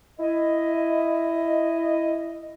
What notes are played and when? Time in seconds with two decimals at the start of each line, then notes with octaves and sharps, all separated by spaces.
0.20 E4 D#5